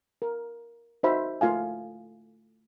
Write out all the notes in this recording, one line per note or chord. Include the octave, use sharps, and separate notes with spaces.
A#4
D#4 F#4 C5 E5 B5
A3 F4 F5 G#5